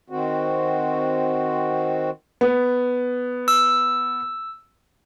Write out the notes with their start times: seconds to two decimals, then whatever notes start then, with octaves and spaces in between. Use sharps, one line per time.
0.10 D#3 C4 F#4
2.41 B3
3.48 E6